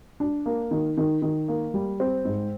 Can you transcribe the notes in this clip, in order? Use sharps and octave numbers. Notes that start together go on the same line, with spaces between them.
D4
A#3
D#3
D#3
D#3
A#3
G3
C4
G#2